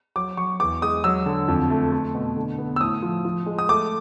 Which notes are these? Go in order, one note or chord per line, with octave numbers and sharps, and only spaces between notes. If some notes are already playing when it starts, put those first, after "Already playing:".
F#3 D6
F#3 C#6
E2 D6
G#3 D#6
F#3 E6
D3
F2
A3
A3
B2
D3
B3
E6
A2 D#6
F3
F3
G#3
D#6
A3 D6